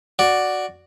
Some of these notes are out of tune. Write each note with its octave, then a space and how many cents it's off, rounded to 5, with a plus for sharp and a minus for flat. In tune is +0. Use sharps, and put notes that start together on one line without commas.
F#4 +0 D5 +0